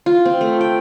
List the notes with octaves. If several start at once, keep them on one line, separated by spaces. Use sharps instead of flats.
F4
C4
A3
G5